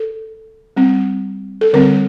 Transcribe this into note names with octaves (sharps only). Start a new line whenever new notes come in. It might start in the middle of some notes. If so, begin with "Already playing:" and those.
Already playing: A4
G3 C4
A4
D3 G3 C4 A#4